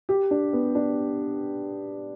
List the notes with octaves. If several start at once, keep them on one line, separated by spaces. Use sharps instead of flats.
G4
D4
B3
D4